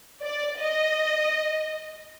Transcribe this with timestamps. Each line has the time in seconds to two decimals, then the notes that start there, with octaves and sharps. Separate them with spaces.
0.22 D5
0.59 D#5